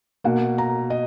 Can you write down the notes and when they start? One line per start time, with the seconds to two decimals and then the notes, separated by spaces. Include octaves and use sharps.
0.24 B2 A#3 F#5
0.58 A#5
0.90 D#5